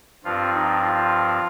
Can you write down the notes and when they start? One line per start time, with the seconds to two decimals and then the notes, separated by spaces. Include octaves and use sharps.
0.24 G2 F3 C4 F4
0.53 D#4
0.83 F4